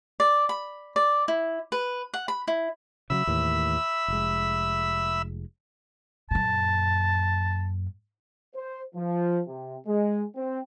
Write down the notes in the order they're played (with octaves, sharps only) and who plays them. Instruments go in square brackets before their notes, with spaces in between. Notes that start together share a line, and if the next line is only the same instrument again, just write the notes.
[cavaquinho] D5
B5
D5
E4
B4
F#5
B5
E4
[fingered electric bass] C#3 F3 F#3 [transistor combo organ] E5 B5 E6
[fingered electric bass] D#2 A2 E3
F1 G#3
[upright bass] F#2 A#2 [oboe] A5
[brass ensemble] C5
F3
C3
G#3
C4